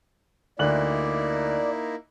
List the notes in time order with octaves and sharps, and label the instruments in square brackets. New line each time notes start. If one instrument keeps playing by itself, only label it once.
[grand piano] D2 F#6 F#7 [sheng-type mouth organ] A#3 D#4 E4 [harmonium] D5